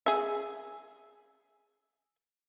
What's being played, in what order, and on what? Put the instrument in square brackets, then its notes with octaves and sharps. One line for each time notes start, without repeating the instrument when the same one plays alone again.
[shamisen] G#4 E5